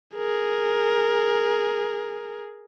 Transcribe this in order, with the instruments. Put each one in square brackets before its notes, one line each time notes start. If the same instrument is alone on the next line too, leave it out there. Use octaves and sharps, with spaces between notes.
[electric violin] G#4 A#4